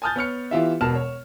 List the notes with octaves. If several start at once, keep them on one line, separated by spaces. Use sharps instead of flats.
G#5 A5 D#6 F6 G6 A6
B3 C#5 F6 C#7
E3 B3 E4 F4 G4 E5
E1 B2 A#4 A5 F6 E7
C#5